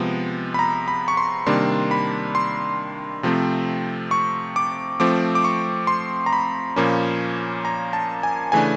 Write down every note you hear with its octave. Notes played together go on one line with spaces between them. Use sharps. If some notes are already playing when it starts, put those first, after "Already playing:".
Already playing: C3 F3 G#3 B3
B5
A#5
B5
C#6
C6
C3 D#3 G3 A#3 D4 C6
B5
C6
C3 F3 A3 C4
C#6
D6
F3 A3 C4 D6
D6
C#6
C6
A#5
B5
A#2 F3 A#3 C#4
A#5
A5
G#5
C#3 E3 A3 D4 G#5